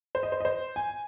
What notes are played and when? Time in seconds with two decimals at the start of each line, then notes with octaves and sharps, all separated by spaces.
0.15 C5
0.23 D#5
0.32 C5
0.40 D#5
0.45 C5
0.76 G#5